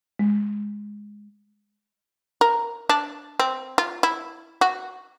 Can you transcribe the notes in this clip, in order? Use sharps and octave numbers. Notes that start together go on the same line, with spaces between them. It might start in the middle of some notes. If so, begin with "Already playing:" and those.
G#3
A#4
D4
C4
F4
E4
F#4